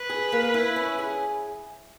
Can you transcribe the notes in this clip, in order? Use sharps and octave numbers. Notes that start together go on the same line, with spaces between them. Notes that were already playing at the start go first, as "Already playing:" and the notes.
Already playing: B4
G#4
A#3
E4
C#4
G#4